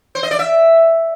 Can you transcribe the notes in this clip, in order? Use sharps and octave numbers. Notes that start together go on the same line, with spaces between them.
C5
D#5
D5
E5